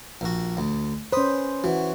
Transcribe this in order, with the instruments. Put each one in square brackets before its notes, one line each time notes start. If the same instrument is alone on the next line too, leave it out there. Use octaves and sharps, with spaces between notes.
[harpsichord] A#1 F#4
D2
[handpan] C#4 C5 [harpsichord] B4 D#6
[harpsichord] E3 [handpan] F#4